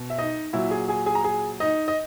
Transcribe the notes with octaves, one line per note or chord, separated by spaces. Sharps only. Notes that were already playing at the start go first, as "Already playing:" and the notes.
Already playing: B2
E5
D#4 D#5
A#2 F#3 E4 E5
G#4 G#5
G#4 G#5
G#4 G#5
A#5
G#4 G#5
D#4 D#5
D#5